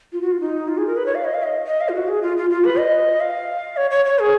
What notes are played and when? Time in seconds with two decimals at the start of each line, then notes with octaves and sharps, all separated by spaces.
0.13 F4
0.21 F#4
0.31 F4
0.40 D#4
0.68 F4
0.78 G#4
0.87 A#4
0.96 B4
1.06 C#5
1.15 F5
1.25 D#5
1.34 F5
1.43 D#5
1.66 D#5
1.81 F5
1.89 F4
1.94 F#4
2.08 G#4
2.22 F4
2.37 F4
2.50 F4
2.64 B4
2.79 D#5
3.20 F5
3.77 C#5
3.90 C#5
4.05 C#5
4.19 G#4